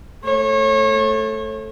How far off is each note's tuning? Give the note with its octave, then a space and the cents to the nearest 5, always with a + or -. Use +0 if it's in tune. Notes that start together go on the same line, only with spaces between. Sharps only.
A3 +0 C#5 -35